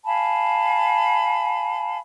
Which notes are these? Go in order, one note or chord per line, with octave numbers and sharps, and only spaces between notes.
F5 G#5 A5 B5